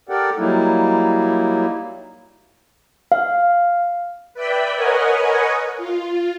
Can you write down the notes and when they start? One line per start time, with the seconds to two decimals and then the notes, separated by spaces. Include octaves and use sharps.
0.09 G4 A4 A#4 D5 F#5 G5
0.38 F#3 G3 A#3 D#4 E4
3.12 F5
4.34 B4 D5 E5 G5 B5
4.76 A#4 B4 C#5 D#5 F#5 G#5
5.77 F4